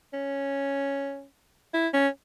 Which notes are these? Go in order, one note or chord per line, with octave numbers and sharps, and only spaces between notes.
C#4
E4
C#4